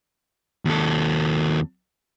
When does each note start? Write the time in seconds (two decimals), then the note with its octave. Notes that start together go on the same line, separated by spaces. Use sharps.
0.65 D#2 A4